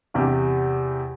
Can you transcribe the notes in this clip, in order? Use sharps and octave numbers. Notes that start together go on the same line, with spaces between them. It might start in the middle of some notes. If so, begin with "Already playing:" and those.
E2 C3 G4